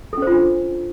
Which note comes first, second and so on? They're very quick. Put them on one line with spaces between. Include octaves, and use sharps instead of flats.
A4 C#4 C5 F4 D4